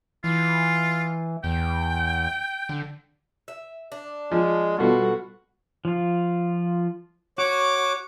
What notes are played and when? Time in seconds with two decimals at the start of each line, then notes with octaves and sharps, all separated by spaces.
0.24 E3 F4
1.44 E2 G5
2.69 D3
3.48 E5
3.92 D4
4.32 F3 G#3
4.79 B2 G3 F4 F#4 A4
5.85 F3 F4
7.38 F#4 C#5 D6